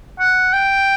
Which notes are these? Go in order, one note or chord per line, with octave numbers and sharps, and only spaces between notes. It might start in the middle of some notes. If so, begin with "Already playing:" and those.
F#5
G5